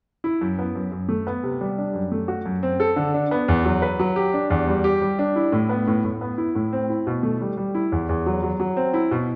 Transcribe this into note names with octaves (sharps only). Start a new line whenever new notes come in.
E4
F#2
B3
F#2
F#2
A3
B3
C3
G3
D4
F#2
A3
F#4
F#2
C4
A4
D3
D4
B3
E2
F#3
B4
F#3
G4
D4
E2
G3
G4
G3
D4
E4
A2
B3
A2
A2
B3
E4
A2
C4
E4
B2
A3
G3
G3
E4
E2
E2
F#3
F#3
F#3
C4
E4
B2